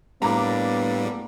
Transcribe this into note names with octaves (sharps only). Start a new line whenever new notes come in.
A2 G3 A#3 B3 D4 A#5 B5 D6